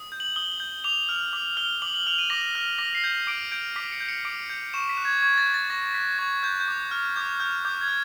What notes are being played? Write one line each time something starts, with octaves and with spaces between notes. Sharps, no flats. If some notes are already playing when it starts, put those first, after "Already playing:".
Already playing: D#6
G6
F#7
D#6 G7
G6
D6 F7
F6
D6
F6 G7
D6 F#7
F#7
F6 F7
D#7
D6 A#6
F6
D6 A#6
C7
G6
D6 D7
G6 D7
D6 B6
C#7
G6
C#7
D6 D7
G6
C#6 E7
B6
F#6
G#6
C#6 G#6
A6
F#6
A6
C#6 A#6
F#6 B6
C#6 G#6
F#6 G6
G6
D6
F6
D6 G6
F6 G6
D6 G6
G#6
F6